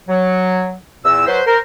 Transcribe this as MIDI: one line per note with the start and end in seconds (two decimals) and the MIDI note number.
0.08 0.73 54
1.04 1.24 40
1.04 1.24 46
1.04 1.24 88
1.27 1.41 54
1.27 1.41 71
1.27 1.41 72
1.46 1.58 70
1.46 1.58 72